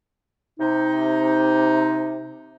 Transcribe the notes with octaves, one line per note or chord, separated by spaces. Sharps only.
C3 D#4